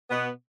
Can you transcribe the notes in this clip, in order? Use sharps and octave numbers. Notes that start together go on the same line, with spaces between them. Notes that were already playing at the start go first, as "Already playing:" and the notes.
B2 B3